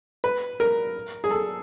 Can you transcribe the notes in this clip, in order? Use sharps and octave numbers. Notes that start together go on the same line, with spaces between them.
B4
A#4
G#4
A4